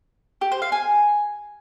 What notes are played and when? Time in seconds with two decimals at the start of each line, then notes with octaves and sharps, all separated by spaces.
0.41 G4
0.52 C5
0.62 F5
0.72 G#5